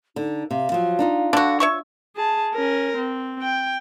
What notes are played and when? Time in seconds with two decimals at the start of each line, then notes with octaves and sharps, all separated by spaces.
0.16 D3 D#4
0.51 C3 F5
0.72 F3 F#3
0.99 D4 D#4 F4
1.33 D3 D4 F#4
1.60 F4 C#5 E5 C#6
2.16 G#4 A5
2.54 C#4 A#4
2.97 C4
3.42 G5